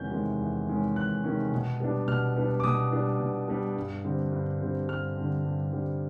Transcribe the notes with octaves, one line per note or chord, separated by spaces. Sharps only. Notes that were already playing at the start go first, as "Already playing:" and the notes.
Already playing: E2 C3 D#3 G#3 C#4 G6
C3 D#3 G#3 C#4
E2
C3 D#3 G#3 C#4
E2 F#6
C3 D#3 G#3 C#4
B2
G3 B3 D4
B2 F6
G3 B3 D4
D6
B2 D#6
G3 B3 D4
B2
G3 B3 D4
G2
D3 G3 C4
G2
D3 G3 C4
G2 F6
D3 G3 C4
G2
D3 G3 C4